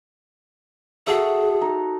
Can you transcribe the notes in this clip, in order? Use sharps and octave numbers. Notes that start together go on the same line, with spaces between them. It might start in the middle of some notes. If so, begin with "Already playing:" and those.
F#4 G#4 A4 E5
D#4